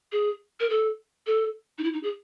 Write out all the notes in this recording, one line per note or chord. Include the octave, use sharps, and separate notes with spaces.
G#4
A#4
A4
A4
D#4
E4
D#4
G#4